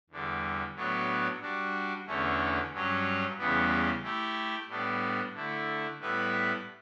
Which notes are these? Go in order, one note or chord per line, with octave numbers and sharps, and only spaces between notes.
E2 D3 G3
A2 F#3 B3 D4 F#4
G3 D4 F#4
E2 D3 A3 C#4
G2 F#3 C#4
E2 C#3 E3 G3 B3
A3 E4 G4
A2 G3 B3 D4
D3 A3 E4
A2 G3 B3 E4 B4